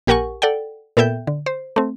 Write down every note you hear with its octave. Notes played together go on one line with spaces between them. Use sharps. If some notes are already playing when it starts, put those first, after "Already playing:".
A#1 G4 A#4 F#5 G#5 C#6
A4 D5 F#5 G5
A#2 B3 A4 E5 G5 G6
D3
C5
A3 C4